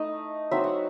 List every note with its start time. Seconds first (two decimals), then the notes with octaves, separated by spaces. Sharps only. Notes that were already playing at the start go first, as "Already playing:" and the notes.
Already playing: A3 D#4 D#5
0.51 F#3 C4 D#4 E5
0.64 F#5